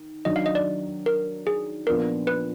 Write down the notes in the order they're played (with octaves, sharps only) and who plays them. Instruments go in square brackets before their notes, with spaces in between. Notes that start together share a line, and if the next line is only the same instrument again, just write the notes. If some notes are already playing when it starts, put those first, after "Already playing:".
Already playing: [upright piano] D#3
[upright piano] D#3 F#3 D4 [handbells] D#5
[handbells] F5
D#5
D5
A#4
G#4
[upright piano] A#2 F3 B3 D4 [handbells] A#4
[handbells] B4